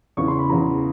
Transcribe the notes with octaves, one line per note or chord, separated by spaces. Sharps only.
E2 C#3 E3 C#6
C6
B5
E2 C#3 E3 A#5